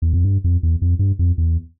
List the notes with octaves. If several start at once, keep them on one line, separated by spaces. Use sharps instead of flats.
E2
F2
G2
F2
E2
F2
G2
F2
E2